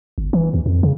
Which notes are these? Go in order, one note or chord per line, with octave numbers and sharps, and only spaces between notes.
G1
E3
D#2
F2
C#3